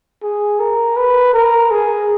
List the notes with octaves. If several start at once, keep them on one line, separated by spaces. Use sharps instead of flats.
G#4
A#4
B4
A#4
G#4